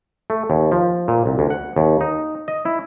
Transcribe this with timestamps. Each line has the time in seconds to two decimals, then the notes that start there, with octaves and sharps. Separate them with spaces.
0.30 A3
0.50 D#2
0.72 F3
1.08 A#2
1.26 C2
1.39 D2
1.50 F#5
1.76 D#2
2.01 D#4
2.48 D#5
2.65 E4